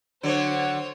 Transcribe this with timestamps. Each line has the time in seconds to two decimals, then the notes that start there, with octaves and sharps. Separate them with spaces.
0.23 D3 F#3 C5 C#5